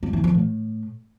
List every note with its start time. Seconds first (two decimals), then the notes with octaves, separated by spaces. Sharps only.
0.03 G3
0.13 E3
0.24 F3
0.34 A2